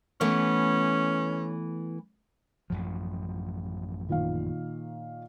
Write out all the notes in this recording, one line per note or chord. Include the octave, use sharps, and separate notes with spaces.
E3 A3 B3 C#4
A1 F#2 F3
A#2 D#3 F5